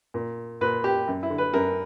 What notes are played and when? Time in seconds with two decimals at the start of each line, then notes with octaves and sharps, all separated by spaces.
0.14 A#2
0.61 A#2 B4
0.84 G4
1.08 F#2
1.23 E4
1.30 D3
1.38 B4
1.54 F#2 A#4